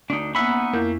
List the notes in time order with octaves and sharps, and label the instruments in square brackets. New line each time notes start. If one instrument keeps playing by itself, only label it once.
[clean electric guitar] D2 [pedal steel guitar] D4 D#4
[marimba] A#3 B3 [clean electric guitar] C#4 E5 [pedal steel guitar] D#4 F#5 B5
[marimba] F2 E4 G6 [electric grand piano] A#3